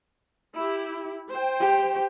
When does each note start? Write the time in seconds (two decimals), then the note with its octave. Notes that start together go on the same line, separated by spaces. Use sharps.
0.55 E4 G4
1.30 C5 G5
1.60 G4